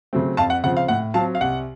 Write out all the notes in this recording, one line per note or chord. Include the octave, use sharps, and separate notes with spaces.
C#3 F#3 A3 C4
F2 F5 A5
F#5
C#3 F3 C4 F#5
F5
A2 F#5
F#3 C4 F5 A5
F5
C2 F#5